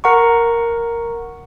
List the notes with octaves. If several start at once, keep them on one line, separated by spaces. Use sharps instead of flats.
A#4 F#5 A#5 C#6